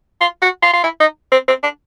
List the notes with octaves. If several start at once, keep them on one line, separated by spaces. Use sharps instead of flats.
F4
F#4
F4
F4
E4
D#4
C4
C4
D4